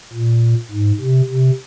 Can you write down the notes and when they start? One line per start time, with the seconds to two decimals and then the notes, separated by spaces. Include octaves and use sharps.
0.13 A#2
0.71 G#2
1.00 C3
1.30 C3